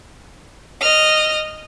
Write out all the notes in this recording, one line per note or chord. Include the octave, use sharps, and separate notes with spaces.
D#5 F6